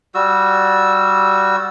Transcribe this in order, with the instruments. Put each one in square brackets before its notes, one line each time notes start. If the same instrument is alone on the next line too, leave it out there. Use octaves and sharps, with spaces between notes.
[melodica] G3 F#4 E6